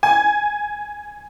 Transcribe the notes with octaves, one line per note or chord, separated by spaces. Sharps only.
G#5